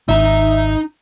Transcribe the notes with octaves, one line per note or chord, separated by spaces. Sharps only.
G#1 D#4 E5 A#5